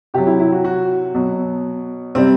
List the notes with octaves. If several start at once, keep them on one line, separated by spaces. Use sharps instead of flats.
C3 F#3 G4
E4
E4
F#4
F#4
B2 F#3
C3 G3 C4